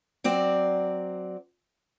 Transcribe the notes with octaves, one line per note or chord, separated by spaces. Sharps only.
F#3 C4 D5